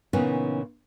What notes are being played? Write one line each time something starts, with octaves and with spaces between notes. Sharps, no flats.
A#2 C#3 E3 B3 C#4 D#4